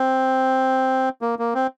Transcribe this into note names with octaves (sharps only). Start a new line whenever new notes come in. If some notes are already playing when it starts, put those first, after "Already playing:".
Already playing: C4
A#3
A#3
C4